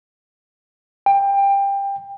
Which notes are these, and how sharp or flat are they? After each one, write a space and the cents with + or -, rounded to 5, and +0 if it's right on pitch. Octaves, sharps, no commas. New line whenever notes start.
G5 +20